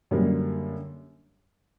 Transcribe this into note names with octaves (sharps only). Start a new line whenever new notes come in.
F#2 D3 G3 A#3 D4